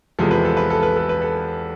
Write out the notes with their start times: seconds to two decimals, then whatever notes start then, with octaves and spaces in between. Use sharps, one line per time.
0.19 E2 C3 F3 G#3 A4
0.31 B4
0.45 A4
0.57 B4
0.70 A4
0.83 B4
0.97 A4
1.09 B4
1.22 A4